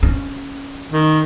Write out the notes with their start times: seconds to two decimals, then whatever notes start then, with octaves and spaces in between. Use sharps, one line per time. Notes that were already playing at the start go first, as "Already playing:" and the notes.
0.03 C#4
0.92 D#3